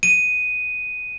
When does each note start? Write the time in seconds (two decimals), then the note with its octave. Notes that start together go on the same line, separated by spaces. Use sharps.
0.03 D#7